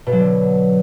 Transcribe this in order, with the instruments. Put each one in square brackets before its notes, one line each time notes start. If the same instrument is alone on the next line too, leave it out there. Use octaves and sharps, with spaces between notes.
[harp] B2
F#3
D3